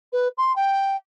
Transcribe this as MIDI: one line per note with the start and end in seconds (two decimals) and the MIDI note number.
0.13 0.28 71
0.38 0.55 84
0.56 0.96 79